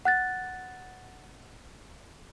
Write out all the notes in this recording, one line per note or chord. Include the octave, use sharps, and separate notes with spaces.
F#5 F#6 A6